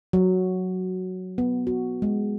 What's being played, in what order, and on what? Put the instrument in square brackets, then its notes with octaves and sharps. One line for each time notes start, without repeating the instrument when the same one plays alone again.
[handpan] F#3
B3
F#4
G#3